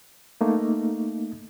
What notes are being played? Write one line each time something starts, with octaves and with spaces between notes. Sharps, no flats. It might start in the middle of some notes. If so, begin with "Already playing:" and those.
A3 A#3 D#4